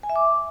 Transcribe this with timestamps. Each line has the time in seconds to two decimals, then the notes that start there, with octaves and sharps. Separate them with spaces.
0.03 G#5
0.09 E5
0.16 D6